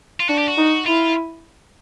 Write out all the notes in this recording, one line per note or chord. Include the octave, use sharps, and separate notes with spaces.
F4
D4 F#4
G4
F#4
D#4
E4 F4